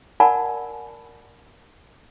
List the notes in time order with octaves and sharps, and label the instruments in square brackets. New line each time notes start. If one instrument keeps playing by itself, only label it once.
[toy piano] A#4 D5 F#5 G#5 A5 B5